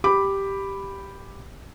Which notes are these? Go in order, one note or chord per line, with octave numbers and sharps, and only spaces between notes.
G4 B5 D6